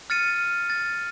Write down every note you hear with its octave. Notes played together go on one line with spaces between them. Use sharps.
F6 A6 C#7 D#7
A6